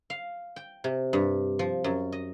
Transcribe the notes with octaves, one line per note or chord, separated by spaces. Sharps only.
F5
G5
C3
G2
F3
F#2
D#5